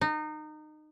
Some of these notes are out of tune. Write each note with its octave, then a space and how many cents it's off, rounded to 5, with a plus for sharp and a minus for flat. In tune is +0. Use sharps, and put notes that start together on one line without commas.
D#4 -25